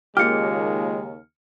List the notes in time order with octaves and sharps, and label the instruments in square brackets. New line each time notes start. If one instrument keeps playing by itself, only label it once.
[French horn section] D#2 C#3 [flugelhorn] G#3 [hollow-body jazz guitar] A#3 F4 G4 [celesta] F6 C#7